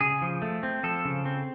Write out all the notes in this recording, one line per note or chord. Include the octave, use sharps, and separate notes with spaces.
C#3 G#4
F3
A3
C4
F3 A4
C#3
C4